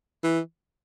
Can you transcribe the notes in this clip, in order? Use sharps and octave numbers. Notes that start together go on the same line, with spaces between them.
E3